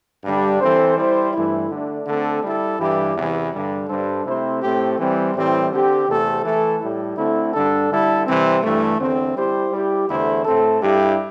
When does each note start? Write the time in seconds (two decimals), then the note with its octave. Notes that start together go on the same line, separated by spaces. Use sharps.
0.24 G2 D3 G3 D4
0.61 E3 C4 A4 C5
0.97 G3 E4 C5
1.34 G2 E3 A3 E4
1.70 D3 A3 D4
2.07 D3 A3 C4 A4
2.44 G3 E4 A4
2.80 G2 E3 G3 E4 G4
3.16 E2 C3 E3
3.52 G2 D3 G3
3.89 G2 G3 D4 A4 C5
4.25 C3 A3 C4 E4 C5
4.62 A2 A3 C4 G4 C5
4.98 E3 G3 C4
5.35 A2 E3 G3 C4
5.72 D3 C4 G4
6.08 E2 C3 A3 C4 A4
6.44 E3 A3 E4 A4
6.80 A2 G3 E4
7.17 D3 A3 C4 E4
7.54 G2 D3 G3 D4 A4
7.90 D3 G3 E4 A4
8.27 C3 E3 G3 C4
8.63 G2 E3 A3
8.99 E2 D3 C4
9.36 G3 E4 G4 C5
9.72 G3 E4 G4
10.09 E2 D3 A3 E4 C5
10.45 A2 A3 C4 A4
10.82 G2 G3 E4 G4